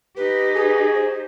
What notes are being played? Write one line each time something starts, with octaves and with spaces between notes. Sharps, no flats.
D#4 G4 B4
G#4 B4
C5